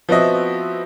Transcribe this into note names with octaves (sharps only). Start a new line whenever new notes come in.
F3 B3 C4 F#4 D#5 E5